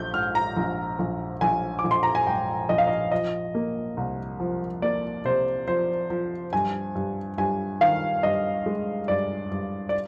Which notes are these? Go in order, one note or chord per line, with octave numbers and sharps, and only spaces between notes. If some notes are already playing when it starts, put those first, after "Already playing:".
Already playing: A#1 G6
G#2 F6
A#5
A#1
A#1
A#1 G#5
D6
A#1
C6
A#5
G#5
G#2 G5
A#1 D#5
F5
D#5
F3 D#5
A#3
C2
F3
A#3 D5
C3 C5
F3 C5
F3
G2 G#5
G2
G2 G#5
D#3 F5
G2 D#5
G#3
G2 D5
G2
D5